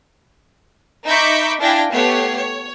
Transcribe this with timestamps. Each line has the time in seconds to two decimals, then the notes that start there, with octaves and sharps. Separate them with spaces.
1.06 D#4 E5 B5 C#6 D6 G6
1.60 D4 E4 F5 G5 G#5 A#6
1.91 A3 B3 G4 C#5 F#5 C7
2.36 C#5